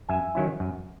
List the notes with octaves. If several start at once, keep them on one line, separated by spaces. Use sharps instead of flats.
F#2 E5 G#5
D#3 F#3 C#4 E4
F#2